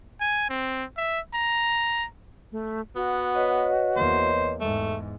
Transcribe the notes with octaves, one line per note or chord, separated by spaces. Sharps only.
G#5
C4
E5
A#5
A3
B3 F#4
B4 C#5 D#5
E2 A#3 C5
E2 G#2 A3